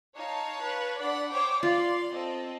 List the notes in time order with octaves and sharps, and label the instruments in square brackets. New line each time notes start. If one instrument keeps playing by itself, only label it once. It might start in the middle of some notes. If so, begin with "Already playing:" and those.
[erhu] D#4 [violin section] C#5 F5 A5
[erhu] B4
[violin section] D4 F#5 B5 [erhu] D5
[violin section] C5 C#5 G5 [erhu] D6
[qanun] F4 [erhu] D5 [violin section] F5 C6
[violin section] C4 A4 [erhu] D#5